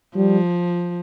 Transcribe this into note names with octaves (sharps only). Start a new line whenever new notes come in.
F3 G3